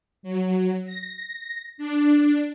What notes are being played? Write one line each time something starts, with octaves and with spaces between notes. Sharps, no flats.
F#3
A#6
D4